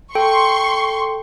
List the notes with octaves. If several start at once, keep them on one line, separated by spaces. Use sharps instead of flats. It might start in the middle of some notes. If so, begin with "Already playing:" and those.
A4 G5 C6 C#6